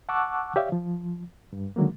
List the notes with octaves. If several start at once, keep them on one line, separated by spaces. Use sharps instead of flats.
F#5 A5 C#6 D6 E6 F#6
G4 C#5 D5 E5 F5
F3
G2
D3 D#3 F#3 G#3 A#3